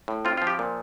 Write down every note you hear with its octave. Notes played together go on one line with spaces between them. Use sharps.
A2
C4 F4
F3 F4
G4
A#2